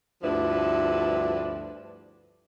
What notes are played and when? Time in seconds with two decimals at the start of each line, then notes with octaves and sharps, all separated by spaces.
0.23 D2 G2 F3 D4 E4 B4